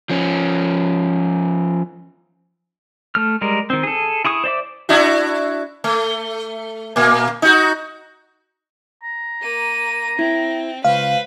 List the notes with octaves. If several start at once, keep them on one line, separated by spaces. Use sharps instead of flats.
F3 C#4
A3 F6
G3 G#3 A#4
D#3 C4
G#4 A4
E4 G#4 C#6 D#6
C5 D5 E5 D6
D4 E4 F#4
A3
A#2 A#3
D#4 F#4
A#5
A#3 D#7
C4 E4
C#2 B4 C5 F5